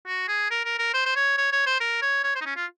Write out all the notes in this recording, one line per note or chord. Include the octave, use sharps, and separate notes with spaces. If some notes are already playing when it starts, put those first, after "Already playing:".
F#4
G#4
A#4
A#4
A#4
C5
C5
C#5
C#5
C#5
C5
A#4
C#5
C#5
C5
D#4
C#4
F4